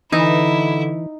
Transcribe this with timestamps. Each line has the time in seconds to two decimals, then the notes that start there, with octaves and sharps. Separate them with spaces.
0.12 D3 E3 D#4 E4